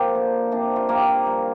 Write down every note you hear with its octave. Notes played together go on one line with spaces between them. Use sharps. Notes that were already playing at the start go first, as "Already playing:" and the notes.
Already playing: A#2 F3 C4 F4 G4 A#4 C5
D3 A#3
C3 A#3 D4
F4
G2 G3 A#3 C4 A#4
G2 F3 C4